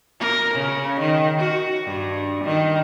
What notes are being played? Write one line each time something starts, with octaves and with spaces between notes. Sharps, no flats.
A#4
C#3
D#3
F#4
G2
D#3